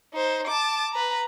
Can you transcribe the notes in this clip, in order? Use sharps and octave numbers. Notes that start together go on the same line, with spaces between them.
D#4 C5
A5 D6
B4 A#5